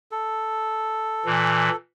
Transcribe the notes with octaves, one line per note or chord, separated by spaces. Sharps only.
A4
A#2 E3